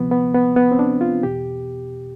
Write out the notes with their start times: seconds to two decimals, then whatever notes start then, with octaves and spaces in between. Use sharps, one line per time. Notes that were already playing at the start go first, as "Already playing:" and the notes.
Already playing: D2 C3 F3 B3
0.11 B3
0.34 B3
0.56 B3
0.72 C4
0.79 D4
1.01 F4
1.23 E2 B2 G4